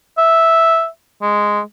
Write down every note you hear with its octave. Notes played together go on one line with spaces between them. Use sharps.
E5
G#3